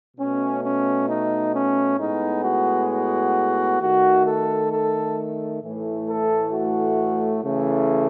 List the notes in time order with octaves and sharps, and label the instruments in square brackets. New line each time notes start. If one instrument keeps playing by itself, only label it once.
[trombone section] B2 A3 C#4
C#4
D#4
C#4
A2 G#3 B3 D#4
F#4
F#4
D#3 A3 F#4
A4
A4
A2 E3 A3
A4
F#4
C#3 E3 A3